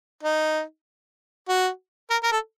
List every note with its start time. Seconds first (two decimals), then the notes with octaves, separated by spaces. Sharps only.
0.23 D#4
1.49 F#4
2.10 A#4
2.23 A#4
2.32 A4